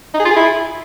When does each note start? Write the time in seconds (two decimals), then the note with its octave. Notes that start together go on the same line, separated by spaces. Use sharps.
0.14 D#4
0.20 G#4
0.25 F4
0.31 G#4
0.36 E4